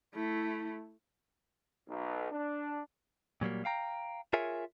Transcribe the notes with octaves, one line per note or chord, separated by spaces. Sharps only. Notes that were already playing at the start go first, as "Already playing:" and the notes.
A3 E4
B1
D4
A#2 F#3 G3 A#3
F5 G5 A#5
F4 G#4 A#4 C#5 E5 G#5